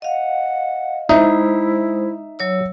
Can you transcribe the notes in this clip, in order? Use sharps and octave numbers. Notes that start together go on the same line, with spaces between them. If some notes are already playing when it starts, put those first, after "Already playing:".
D#5 F5 F#5
G#3 D#4 E4 C5 E5 D#6
F#3 C#5 E6